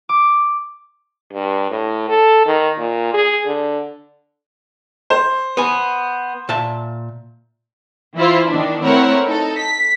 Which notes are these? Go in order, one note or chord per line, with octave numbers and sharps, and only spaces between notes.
D6
G2
A2
A4
D#3
A#2
G#4
D3
C5
B3 G#5
A#2 E5 A5
E3 E4 F4 C5
D#3 B3 D4
A3 C4 E4 A#4 C#5 F#5
D#4 A4
B6